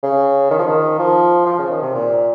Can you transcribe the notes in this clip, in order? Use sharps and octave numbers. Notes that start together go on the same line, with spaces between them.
C#3
D#3
F3
D#3
F3
F3
C#3
D#3
C3
A#2